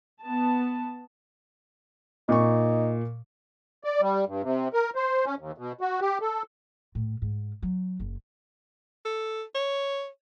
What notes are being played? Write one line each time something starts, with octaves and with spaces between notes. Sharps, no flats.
B3 A5
A#2 D#4 C#6
D5
G3
G2
C3
A#4
C5
C#4
D#2
B2
F#4
G4
A4
A2
G#2
F#3
F#1
A4
C#5